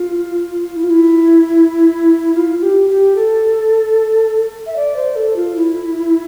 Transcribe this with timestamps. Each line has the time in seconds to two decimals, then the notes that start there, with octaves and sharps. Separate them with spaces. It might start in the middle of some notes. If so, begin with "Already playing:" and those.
Already playing: F4
0.76 E4
0.83 F4
0.90 E4
2.36 F4
2.62 G4
2.90 G4
3.16 A4
4.66 E5
4.76 D5
4.96 C5
5.16 A4
5.36 F4
5.56 E4